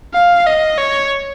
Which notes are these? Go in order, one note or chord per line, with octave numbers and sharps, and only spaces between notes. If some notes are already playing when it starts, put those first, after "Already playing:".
F5
D#5
C#5